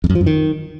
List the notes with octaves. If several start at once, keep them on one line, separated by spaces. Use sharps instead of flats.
F2
F#2
F3
F#2
D#3